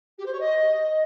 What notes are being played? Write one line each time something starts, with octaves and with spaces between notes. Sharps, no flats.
G4
C5
C#5
D#5